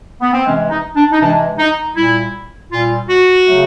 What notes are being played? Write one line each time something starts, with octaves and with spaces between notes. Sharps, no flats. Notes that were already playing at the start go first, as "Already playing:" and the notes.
B3
C4
C3 E3 G#3 C#4
D#4
D4
D#4
C3 E3 G#3 D4
D#4
A#2 G3 E4
A#2 G3 F4
F#4
C#3 F#3 A3